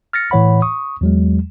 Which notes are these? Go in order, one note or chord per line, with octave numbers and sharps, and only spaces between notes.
F6 A6 A#6 C#7
A2 E3 C#5 F#5 B5
C#6 D#6
E2 F#3 G#3